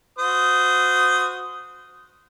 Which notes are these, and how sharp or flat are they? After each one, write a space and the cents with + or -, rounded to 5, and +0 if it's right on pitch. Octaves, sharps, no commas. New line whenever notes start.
F#4 -25 C5 -25 D#6 +0